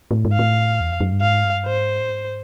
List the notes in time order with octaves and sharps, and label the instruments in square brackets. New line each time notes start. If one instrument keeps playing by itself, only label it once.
[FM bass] A2
G#2
[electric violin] F5
[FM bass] A2
E2
F2
F#2
G2
[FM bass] G#2 [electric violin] F5
[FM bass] G2
[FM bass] G#2 [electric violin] C5
[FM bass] A2
G#2